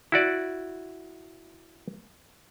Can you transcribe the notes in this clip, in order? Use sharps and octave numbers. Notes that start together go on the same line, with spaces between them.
E4 F#4 D5